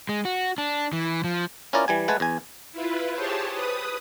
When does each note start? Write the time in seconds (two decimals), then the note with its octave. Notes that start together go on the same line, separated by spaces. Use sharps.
0.09 G#3
0.25 F#4
0.58 D4
0.93 E3
1.24 F3
1.73 C#4 E4 F4 A#4 D5
1.88 E3 G3 G#5
2.08 G#3 A3 B4 F#5 G#5 A5
2.20 E2 G#5
2.72 E4 F4 B4
3.16 G4 G#4 C5 C#5 A5
3.54 B4 D#6